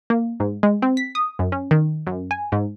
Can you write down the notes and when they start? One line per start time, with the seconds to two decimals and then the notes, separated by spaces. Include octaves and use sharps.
0.10 A#3
0.40 G#2
0.63 G#3
0.82 C4
0.97 B6
1.15 D#6
1.39 F#2
1.52 C#4
1.71 D#3
2.07 F#2
2.31 G#5
2.52 G#2